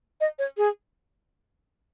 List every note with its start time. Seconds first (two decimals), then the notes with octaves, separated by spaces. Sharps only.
0.21 D#5
0.39 C#5
0.57 G#4